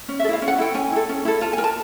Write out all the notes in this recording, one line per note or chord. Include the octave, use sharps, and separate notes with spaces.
C#4
A4 E5
E4 F5
C#4
F#5
E4 A4 G5
C#4 G#5
E4 A4
C#4
E4 A4
F4 A5
G#5
A#4
A5